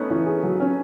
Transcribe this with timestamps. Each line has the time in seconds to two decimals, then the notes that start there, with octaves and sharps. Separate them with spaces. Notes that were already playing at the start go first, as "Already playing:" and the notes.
Already playing: A3 B3 C#4 D#4
0.10 E3 C#4
0.26 G#4
0.43 F#3
0.60 C#4